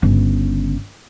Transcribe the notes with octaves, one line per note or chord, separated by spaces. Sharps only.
G1 C#3